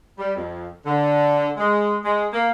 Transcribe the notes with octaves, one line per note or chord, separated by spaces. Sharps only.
G3
F2
D3
G#3
G#3
A#3